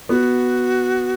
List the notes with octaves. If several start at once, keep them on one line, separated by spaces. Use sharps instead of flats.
B3 F#4